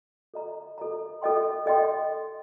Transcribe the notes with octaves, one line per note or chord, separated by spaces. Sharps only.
A4 D#5 A#5
A4 D#5 A#5
A4 D#5 G5 C6
A4 D#5 G5 C6